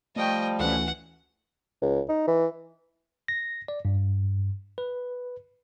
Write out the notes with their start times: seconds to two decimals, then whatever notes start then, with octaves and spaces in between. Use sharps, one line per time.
0.16 F3 G3 A3 D#5 G5
0.59 D2 E3 A3 C#4 F#5
1.82 C#2
2.09 D#4
2.27 E3
3.28 A#6
3.68 D5
3.85 G2
4.78 B4